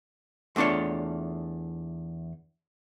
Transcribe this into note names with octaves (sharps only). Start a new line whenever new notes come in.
E2 A3 D4 F4 C#5